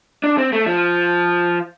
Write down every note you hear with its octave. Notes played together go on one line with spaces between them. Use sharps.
D4
C4
A3
F3